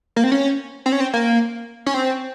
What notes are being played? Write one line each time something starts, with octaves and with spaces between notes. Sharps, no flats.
A#3
C4
C#4
C4
C#4
C4
A#3
C#4
C4